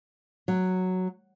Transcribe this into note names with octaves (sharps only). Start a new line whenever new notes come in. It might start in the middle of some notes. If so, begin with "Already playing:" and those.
F#3